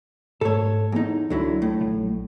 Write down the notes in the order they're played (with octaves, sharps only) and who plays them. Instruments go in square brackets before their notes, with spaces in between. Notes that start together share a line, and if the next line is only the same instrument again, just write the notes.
[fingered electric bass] G#2 A3 [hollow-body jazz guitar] A4 C#5
[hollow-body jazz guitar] E2 D#4 [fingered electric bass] A#3
[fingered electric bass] C#2 [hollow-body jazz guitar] D3 F#3 E4
[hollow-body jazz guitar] A2
[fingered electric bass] A#1 F#3